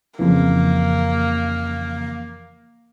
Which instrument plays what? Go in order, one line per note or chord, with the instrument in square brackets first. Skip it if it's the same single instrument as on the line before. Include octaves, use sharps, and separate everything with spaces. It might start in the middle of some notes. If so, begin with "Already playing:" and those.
[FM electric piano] F2 C#3 E3 [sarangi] A#3